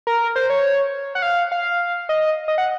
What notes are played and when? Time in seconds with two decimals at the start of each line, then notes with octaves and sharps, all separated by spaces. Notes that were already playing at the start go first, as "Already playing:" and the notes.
0.07 A#4
0.36 C5
0.50 C#5
1.15 F#5
1.22 F5
1.52 F5
2.09 D#5
2.48 D#5
2.58 F#5